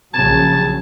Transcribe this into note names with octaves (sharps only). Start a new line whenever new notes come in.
A#1 C#3 F#3 A5 G#6 E7